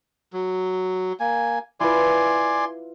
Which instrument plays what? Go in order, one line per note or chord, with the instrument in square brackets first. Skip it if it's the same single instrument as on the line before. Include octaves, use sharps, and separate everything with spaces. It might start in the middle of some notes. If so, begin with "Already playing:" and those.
[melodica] F#3
A#3 G#5
[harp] E4 F4 B4 [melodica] D5 G#5 C6